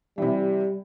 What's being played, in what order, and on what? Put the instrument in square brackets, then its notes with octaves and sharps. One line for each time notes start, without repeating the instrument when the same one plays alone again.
[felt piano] C3 E3 [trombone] G3